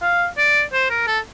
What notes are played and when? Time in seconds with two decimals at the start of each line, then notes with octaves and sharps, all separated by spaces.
0.02 F5
0.38 D5
0.73 C5
0.90 A#4
1.07 A4